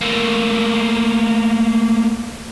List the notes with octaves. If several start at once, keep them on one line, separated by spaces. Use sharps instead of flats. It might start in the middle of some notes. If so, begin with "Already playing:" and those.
A3 A#3